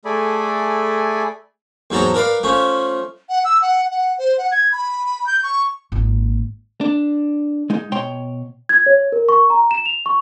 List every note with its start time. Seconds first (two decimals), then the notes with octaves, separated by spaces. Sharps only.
0.05 A3 G#4 A4 D5 G#5 B5
1.90 E2 G#2 F#3 A4 A5 A#5
2.14 A#4 B4 D5 F5
2.43 F3 A3 C#4
3.29 F#5
3.45 E6
3.62 F#5
3.91 F#5
4.18 C5
4.38 F#5
4.52 G#6
4.72 B5
5.26 G6
5.43 C#6
5.92 G#1 A#2
6.81 D4
7.70 G#3 D#4
7.92 B2 C#5 G5 C6
8.69 G#6
8.86 C#5
9.12 A#4
9.29 C#6
9.50 A#5
9.71 E7
9.86 F7
10.06 C#6